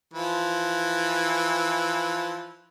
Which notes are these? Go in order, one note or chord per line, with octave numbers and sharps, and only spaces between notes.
E3 F3